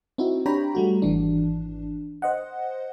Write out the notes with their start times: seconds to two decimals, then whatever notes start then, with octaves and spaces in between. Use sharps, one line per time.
0.18 C4 D#4 E4 F#4
0.46 D4 G4 C#5 G5 A#5 B5
0.75 G3 A3 F#4
1.02 G#1 E3 D4
2.22 C5 D#5 F#5